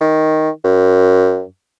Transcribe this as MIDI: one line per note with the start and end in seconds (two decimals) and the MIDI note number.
0.01 0.50 51
0.65 1.44 42